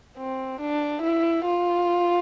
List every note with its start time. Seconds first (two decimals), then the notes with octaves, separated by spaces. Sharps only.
0.18 C4
0.61 D4
1.02 E4
1.45 F4